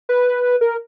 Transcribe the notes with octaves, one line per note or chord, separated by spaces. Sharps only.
B4
A#4